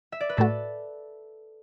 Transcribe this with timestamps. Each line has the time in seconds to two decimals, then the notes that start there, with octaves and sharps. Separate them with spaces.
0.12 E5
0.20 D5
0.29 B4
0.37 A2 A3 F#4 A4